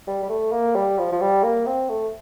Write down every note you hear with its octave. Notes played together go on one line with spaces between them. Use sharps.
G3
G3
A3
A#3
G3
F3
F3
G3
A#3
C4
A3